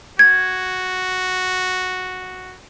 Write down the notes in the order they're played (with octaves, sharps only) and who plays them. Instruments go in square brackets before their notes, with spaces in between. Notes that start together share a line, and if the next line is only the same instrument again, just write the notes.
[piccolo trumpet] F#4 [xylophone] G#6